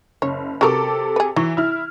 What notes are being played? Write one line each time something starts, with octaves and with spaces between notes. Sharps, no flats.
F#1 C#5
C3 F#3 A4 A#4 D6
G#4 B4
E3 F#3
E4 F6